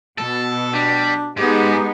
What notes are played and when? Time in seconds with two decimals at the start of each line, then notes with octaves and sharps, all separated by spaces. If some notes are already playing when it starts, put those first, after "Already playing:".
0.18 B2 A4
0.74 G3 D4
1.37 G#2 G#3 B3 D#4 G4